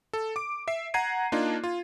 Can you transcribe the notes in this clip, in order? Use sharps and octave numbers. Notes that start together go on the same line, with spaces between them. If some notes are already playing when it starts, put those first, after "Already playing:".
A4
D6 D7
E5 C7
F#5 A#5 G#6 C7 D#7
A#3 D4 D#4 F4
F4